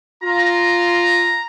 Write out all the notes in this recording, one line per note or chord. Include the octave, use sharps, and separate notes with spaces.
F4 A#5